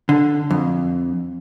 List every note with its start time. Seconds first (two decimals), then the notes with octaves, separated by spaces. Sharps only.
0.09 D3
0.50 F2